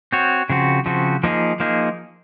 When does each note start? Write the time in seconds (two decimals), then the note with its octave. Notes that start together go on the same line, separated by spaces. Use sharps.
0.12 C4 F#4 C#5
0.50 C#3 F3 C4 F#4
0.86 C#3 F3 C4 F#4
1.23 F3 A#3 D#4 G#4
1.60 F3 A#3 D#4 G#4